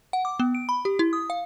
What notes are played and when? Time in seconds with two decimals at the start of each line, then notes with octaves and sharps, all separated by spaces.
0.13 F#5
0.25 D6
0.40 B3
0.55 D7
0.69 B5
0.85 G4
0.99 E4
1.13 D#6
1.30 F5